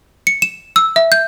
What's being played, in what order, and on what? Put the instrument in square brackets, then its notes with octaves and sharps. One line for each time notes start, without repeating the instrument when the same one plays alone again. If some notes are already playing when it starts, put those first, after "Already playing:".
[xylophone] C#7
E7
E6
E5
G6